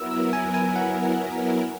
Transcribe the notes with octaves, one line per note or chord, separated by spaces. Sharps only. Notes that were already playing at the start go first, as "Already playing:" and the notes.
Already playing: F#3 B3 E4 A#4 E6
E6
G#5
G#5
F#5